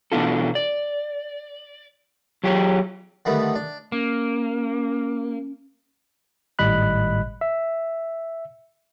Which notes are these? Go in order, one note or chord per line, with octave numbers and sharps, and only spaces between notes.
B2 E3 B3 D4 F4 A4
D5
F#3 F4 G4 G#4 C#5
D3 D#3 G3 A3 B3
D4
A#3 C#4
G#1 A2 G3 D#5 B5 F#6
E5